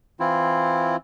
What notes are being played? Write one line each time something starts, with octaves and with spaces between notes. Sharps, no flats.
E3 C4 E4 F4